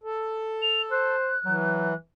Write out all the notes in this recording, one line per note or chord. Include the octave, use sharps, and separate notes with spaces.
A4
F7
C5 F#6
E3 F#3